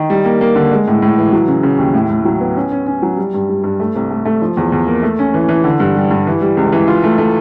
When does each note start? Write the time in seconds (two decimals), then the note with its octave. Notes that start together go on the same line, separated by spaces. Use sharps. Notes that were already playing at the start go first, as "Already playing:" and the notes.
Already playing: D#3
0.10 G3
0.25 A#3
0.41 A#3
0.55 D3
0.72 G#3
0.87 A2
1.02 A2
1.18 E3
1.33 F#3
1.48 C#3
1.63 C#3
1.79 D#2
1.94 A2
2.10 A2
2.25 F#3
2.41 B3
2.56 C#4
2.72 C#4
2.87 C#4
3.02 F#3
3.17 G3
3.34 G2
3.49 G3
3.64 G2
3.80 A3
3.95 C2
4.10 A3
4.25 A3
4.42 F3
4.57 E2
4.72 E2
4.87 A#3
5.02 A3
5.19 C#4
5.34 E3
5.49 E3
5.64 D3
5.80 G2
5.96 G3
6.11 G2
6.27 E3
6.41 G3
6.57 C#2
6.73 E3
6.88 F4
7.04 A3
7.18 A3